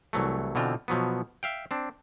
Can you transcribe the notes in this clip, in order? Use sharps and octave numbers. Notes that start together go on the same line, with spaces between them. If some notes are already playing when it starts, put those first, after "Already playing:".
C2 E3 F#3 A3
B2 D3 E3 C4 F4
B2 F3 F#3 B3
E5 F5 G5
C4 D4